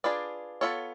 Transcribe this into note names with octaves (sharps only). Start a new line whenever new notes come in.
D4 F4 G#4 B4 D5
B3 F4 A4 C#5